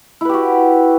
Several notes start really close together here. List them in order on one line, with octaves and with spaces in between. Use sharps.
E4 B4 G4 F#4